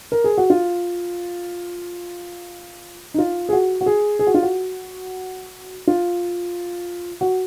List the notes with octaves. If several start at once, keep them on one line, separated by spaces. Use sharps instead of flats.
A#4
G#4
F#4
F4
D#4
F4
G#4
F#4
F#4
G#4
G#4
F#4
F4
F#4
F4
F#4